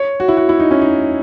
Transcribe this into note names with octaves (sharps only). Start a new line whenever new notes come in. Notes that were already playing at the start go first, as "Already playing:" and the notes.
Already playing: C#5
F#4
E4
F#4
E4
D#4
C#4
D#4